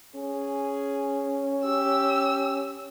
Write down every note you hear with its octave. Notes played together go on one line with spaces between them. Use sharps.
C#4 G#4
G4 E6